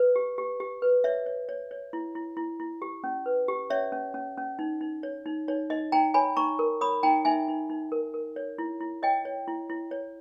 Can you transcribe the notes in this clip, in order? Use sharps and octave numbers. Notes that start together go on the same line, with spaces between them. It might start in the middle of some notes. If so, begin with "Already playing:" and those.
Already playing: B4
G4
G4
G4
B4
C#5 E5
C#5
C#5
C#5
E4
E4
E4
E4
G4
C#4
B4
G4
C#4 C#5 E5
C#4
C#4
C#4
D#4
D#4
C#5
D#4
D#4 C#5
D#4 D#5
D#4 G5 A#5
C#5 G#5 B5
D#4 A#5 C#6
A#4
C#5 B5 D#6
D#4 G5 A#5
D#4 E5 G#5
D#4
D#4
A#4
A#4
C#5
E4
E4
C#5 D#5 G5
C#5
E4
E4
C#5